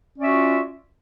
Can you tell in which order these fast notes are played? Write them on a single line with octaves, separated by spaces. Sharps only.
C#4 D5 E5 F#4 F4